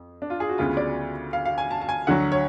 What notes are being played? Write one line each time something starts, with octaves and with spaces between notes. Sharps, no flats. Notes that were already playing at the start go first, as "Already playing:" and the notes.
Already playing: F2
D4
F4
G#4
F#4
D2 C#3 G#3 B3 F4
D5
F5
F5
G#5
A5
A5
G#5
D2 D3 F#3 F#5
C#5